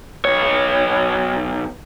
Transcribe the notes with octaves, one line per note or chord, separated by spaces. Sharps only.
B1 C#5